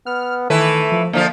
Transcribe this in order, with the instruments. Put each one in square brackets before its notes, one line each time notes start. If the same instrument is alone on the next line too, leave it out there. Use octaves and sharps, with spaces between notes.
[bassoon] B3 [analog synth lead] F6
[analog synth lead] D#3 [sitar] E3 E4 B4 [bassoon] A3
[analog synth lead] F3
[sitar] D3 F3 F4 [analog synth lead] A#3